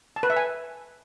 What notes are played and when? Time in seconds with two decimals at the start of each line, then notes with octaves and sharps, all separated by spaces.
0.16 A5
0.23 B4
0.30 E5
0.37 G#5